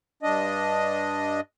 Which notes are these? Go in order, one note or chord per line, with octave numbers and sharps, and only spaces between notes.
G2 D4 D#5